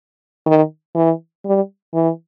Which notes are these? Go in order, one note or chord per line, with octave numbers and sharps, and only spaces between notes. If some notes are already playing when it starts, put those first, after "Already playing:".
D#3
E3
G3
E3